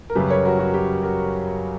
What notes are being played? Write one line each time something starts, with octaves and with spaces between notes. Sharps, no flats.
A#4
F#2 C#3 G3 G4 B4
A#4 C#5
F#4 A#4
F#4
G4
F#4 A#4